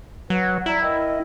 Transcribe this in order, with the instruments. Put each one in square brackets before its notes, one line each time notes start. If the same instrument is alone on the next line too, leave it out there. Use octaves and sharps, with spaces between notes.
[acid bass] F#3 [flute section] B4 F#5
[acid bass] E4 [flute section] D5 A#5
[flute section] A#4 D#5 G5